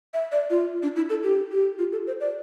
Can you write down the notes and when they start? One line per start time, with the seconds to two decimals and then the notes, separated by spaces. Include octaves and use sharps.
0.14 E5
0.32 D5
0.50 F4
0.83 D4
0.96 E4
1.10 A4
1.23 G4
1.51 G4
1.79 F4
1.92 A4
2.07 C5
2.20 D5